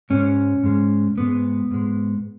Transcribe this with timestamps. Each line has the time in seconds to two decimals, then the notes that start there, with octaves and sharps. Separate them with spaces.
0.10 G#2 G#3 C#4
0.63 G#2 G#3
1.17 G#2 G#3 B3
1.71 G#2 G#3